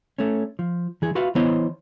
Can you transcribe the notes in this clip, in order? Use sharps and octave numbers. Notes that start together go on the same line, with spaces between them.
A3 C#4
F3
E3 G#4
F4 F#4 B4 E5 F5
E3 B3 E4 C5 C#5 D#5